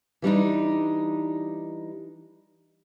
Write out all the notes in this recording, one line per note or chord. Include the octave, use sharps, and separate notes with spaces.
E3 G3 D4 D#4